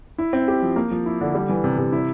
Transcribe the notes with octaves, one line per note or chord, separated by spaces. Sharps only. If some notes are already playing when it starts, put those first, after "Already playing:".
E4
C4
G4
F3
A#3
F3
E4
D3
G3
E3
C3
C3
E4